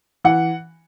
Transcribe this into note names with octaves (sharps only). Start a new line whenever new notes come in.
E3 F#5